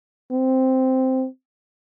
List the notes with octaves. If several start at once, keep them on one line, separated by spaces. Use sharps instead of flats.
C4